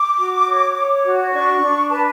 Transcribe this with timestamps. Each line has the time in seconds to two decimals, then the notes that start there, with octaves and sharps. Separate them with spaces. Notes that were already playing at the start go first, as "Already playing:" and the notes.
Already playing: D6
0.17 F#4
0.46 C#5
0.75 C#5
1.04 F#4
1.33 D4 C#6
1.62 D4
1.91 B4 A5